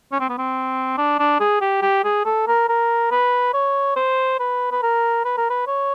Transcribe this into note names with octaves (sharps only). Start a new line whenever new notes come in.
C#4
C4
B3
C4
D4
D4
G#4
G4
G4
G#4
A4
A#4
A#4
B4
C#5
C5
B4
B4
A#4
B4
A#4
B4
C#5